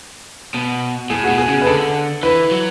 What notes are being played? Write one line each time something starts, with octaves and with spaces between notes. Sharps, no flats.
B2
A2 G#4
F#4
B2
G#4
C#3
B4
D3 A4
E3 B4
F#3